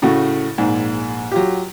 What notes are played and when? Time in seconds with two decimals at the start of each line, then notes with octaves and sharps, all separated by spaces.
0.02 A2 C#3 A3 F#4
0.58 A#1 G#2
1.31 F#3 F4 G4